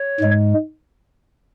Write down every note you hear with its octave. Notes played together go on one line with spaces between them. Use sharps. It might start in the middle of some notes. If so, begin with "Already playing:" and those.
Already playing: C#5
G#2 G#3